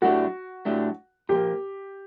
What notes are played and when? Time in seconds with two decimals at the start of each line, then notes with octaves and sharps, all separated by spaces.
0.02 A2 F#3 A3 D4 F#4 G4
0.65 A2 F#3 A3 D4 G4
1.29 A#2 F3 A#3 G4